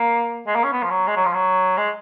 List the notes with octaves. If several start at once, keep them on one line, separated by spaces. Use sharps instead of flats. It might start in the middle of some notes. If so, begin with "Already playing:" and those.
Already playing: A#3
G#3
A#3
C#4
B3
F3
F#3
G#3
F#3
F3
F#3
G#3